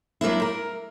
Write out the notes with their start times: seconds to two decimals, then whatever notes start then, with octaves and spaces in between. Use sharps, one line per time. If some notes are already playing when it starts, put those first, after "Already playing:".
0.21 F#3 A#3 D4 E4
0.42 A#4